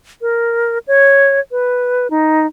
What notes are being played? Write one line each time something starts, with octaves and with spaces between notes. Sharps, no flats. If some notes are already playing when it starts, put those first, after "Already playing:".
A#4
C#5
B4
D#4